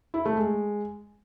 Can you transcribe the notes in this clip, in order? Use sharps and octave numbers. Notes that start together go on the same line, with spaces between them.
E4
A3
G#3